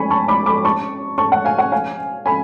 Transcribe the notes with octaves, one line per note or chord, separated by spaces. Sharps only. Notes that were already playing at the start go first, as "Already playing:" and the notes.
Already playing: G#5 B5 C#6
A5 C#6
B5 D6
B5 D6
A5 C#6
A5 C#6
F#5
F5 G#5
F#5
F5 G#5
G#5 B5